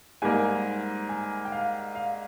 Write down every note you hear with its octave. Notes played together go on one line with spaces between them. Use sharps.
G#2 G3 A#3 G#5
G#5
G5
F5
F5